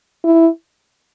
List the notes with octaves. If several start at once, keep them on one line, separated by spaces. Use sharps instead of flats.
E4